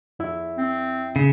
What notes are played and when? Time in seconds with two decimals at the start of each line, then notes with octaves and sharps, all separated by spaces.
0.19 F2 E4 E5
0.58 C4
1.16 C#3